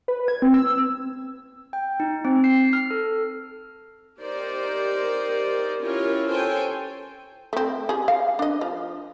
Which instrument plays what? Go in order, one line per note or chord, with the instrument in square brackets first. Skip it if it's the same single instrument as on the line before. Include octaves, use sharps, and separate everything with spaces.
[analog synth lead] B4
G#6
C4
E6
[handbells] G5
D#4
C4
C7
F6
A4
[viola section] D#4 G4 A#4 C5 D5
C#4 E4 F4 G4 A#4 C#5
A4 C5 C#5 G5 G#5
[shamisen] A3 C4
G4 G#4
F5
D4 D#5
F3